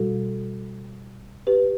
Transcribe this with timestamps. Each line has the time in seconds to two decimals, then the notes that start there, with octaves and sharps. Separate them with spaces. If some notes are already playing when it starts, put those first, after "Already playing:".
Already playing: B2 G3 F#4 A4
1.47 G4 B4